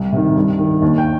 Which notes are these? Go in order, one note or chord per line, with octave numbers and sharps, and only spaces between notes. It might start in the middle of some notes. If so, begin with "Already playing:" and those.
Already playing: C2
C3 D#3
G2
D#3
D#2
G5